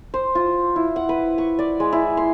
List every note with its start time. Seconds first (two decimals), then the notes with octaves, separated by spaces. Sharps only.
0.14 C5
0.35 F4
0.76 E4
0.96 F#5
1.09 B4
1.38 C#6
1.59 D5
1.80 G#3
1.92 E4
2.17 C6